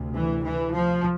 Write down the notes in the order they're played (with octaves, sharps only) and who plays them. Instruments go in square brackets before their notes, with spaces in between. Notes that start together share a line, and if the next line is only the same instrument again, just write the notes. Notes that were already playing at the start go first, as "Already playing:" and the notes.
Already playing: [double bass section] D2 C3
E3
E3
F3